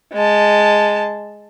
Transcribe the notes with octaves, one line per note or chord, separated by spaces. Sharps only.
G#3 A5